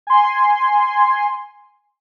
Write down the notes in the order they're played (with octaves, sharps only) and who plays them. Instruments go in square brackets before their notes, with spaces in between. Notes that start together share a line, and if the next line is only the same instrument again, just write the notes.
[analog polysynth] G#5 C6